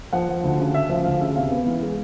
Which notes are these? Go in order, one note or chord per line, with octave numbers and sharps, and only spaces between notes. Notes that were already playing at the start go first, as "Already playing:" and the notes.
F3 F#5
F3
D2
C#3
C#3 E5
F3 E5
D2 F5
C#3 E5
C3 F5
B3
E3
G#3